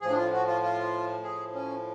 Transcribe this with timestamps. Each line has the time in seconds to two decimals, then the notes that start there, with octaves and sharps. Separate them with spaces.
0.01 A2 F3 G#4
0.11 D4
0.17 F4
0.33 F#4
0.47 F4
0.63 F4
1.23 G#4
1.54 C#4